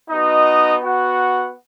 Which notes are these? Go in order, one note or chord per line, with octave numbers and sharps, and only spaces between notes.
B3 D#4 F#4 D#5
F#4 F#5